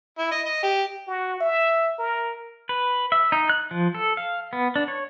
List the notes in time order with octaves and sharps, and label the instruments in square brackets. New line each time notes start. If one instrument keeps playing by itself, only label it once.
[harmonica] E4
D#5
D#5
G4
[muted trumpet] F#4
E5
A#4
[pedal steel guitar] B4
E5
D#4
F#6
F3
A4
F5
B3
D4
C#5